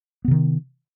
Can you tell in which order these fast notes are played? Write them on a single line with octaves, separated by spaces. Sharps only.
B3 C3 D#3